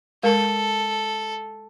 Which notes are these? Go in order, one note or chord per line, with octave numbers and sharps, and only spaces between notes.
G#3 A4 A#4